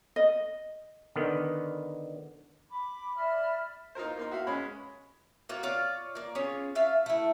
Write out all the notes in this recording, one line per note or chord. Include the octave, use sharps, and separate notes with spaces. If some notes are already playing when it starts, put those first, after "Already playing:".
D#5
D3 D#3 B3
B5 D6
D5 E5 B5 F6
D#4 F4 A#4 C5
A#3 D#4 C6
F#4 E5 F5
G#3 C#4 B5
A#3 F4 F#4 C#5
F4 C#5 D5 F5
A#3 D5
C#4 F4 G#4 C#5
F4 E5 F5
A3 E4